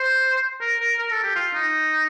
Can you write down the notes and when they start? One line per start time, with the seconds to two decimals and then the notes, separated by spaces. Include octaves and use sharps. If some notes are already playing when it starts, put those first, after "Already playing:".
Already playing: C5
0.61 A#4
0.80 A#4
0.99 A#4
1.11 A4
1.23 G4
1.36 F4
1.54 D#4